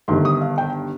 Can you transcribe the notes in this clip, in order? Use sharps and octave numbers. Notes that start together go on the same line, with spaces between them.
G1 G2 D#3 C6
D#6
F5
G5